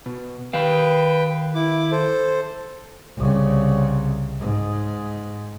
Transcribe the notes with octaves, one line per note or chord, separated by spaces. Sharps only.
B2
D#3 B4 F5 G5
E4 D6
A4 C5
C2 C#3
G#2